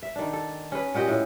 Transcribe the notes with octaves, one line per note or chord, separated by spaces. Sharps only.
E5
D#3 D4
A4
C#4 G#4 B4
A#2 F#4 G4 D#5
A2